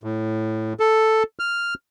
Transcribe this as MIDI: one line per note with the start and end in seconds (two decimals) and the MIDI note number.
0.04 0.73 45
0.80 1.23 69
1.39 1.74 89